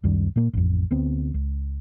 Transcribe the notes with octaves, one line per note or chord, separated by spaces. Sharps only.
C#2 F#2 D#3 G3
A#2 A#3
A1 F2
D2 B3 C4
C#2